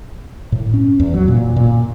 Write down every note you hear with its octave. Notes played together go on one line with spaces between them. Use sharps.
A2
C#4
E2
F#3
A#2
A#2